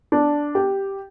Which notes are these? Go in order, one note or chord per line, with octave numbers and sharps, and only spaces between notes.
D4
G4